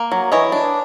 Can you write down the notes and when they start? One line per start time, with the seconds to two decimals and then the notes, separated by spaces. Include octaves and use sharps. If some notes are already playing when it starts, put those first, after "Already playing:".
Already playing: A#3
0.12 F#3
0.32 E3 C#5 D#5
0.52 D4